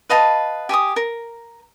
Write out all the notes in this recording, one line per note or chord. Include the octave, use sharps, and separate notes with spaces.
B4 D#5 F5 A5
G4 G#5 C#6 D#6
A#4